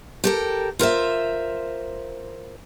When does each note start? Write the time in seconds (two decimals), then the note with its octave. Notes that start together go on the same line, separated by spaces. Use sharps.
0.24 G4 A4 A#4
0.79 F4 A#4 C5 E5